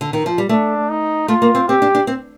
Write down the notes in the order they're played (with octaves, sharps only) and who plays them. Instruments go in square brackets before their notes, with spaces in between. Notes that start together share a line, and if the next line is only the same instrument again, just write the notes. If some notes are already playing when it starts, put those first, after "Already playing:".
[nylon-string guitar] D3
D#3
F3
G3
[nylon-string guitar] A3 [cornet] D4
[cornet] D#4
[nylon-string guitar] A3 [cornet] F4
[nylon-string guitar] A#3
C4
[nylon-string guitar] C4 [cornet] G4
[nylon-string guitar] D4
D4
C4